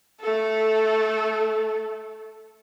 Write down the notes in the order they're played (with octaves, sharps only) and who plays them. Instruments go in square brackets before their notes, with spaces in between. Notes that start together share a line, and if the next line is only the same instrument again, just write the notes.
[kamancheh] A3 A4